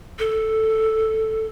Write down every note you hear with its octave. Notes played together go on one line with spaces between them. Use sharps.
A4